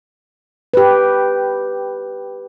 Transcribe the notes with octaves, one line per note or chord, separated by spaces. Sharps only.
G4 B4